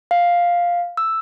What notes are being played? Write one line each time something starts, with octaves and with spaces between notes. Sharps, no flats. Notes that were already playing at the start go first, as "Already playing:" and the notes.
F5
E6